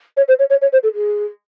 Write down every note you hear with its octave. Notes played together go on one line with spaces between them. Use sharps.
C#5
C5
C#5
C#5
C#5
C5
A4
G#4